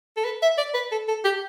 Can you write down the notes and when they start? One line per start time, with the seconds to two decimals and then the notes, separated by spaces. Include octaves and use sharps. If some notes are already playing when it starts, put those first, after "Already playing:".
0.17 A4
0.25 B4
0.42 E5
0.58 D5
0.74 B4
0.92 A4
1.08 A4
1.24 G4